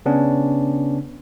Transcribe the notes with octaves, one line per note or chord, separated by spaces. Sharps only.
C#3 B3 C#4 D4